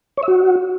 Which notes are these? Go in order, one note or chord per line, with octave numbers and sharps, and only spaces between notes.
C#5
E5
F#4